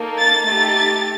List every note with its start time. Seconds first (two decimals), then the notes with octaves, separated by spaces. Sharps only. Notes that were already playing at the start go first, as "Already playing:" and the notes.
Already playing: A#3 D#4 A4
0.18 A6
0.46 A3 D#4 G4 A6